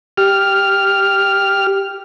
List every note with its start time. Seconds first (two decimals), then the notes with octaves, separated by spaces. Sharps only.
0.18 G4 F6